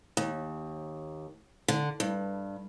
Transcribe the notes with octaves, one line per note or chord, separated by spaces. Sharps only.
D#2
D3
G2